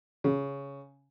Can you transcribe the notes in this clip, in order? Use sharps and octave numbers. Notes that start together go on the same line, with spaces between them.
C#3